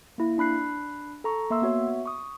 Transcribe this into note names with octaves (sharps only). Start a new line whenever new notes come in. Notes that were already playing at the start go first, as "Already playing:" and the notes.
A#3 E4
D4 B5 F#6 C7
A4 A#5 C#6
A#3 E5 C6 E6
B3 F#4 C#5 E5
C#6 D#6